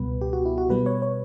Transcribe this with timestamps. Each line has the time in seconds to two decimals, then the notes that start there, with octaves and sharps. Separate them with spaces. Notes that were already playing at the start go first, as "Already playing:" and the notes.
Already playing: C#2 B2 G3 B3 B4
0.21 G4
0.33 F#4
0.45 E4
0.58 F#4
0.69 B2 G3 B3 B4
0.86 C#5
1.02 C#5